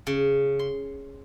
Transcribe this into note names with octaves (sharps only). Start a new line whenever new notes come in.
C#3
C6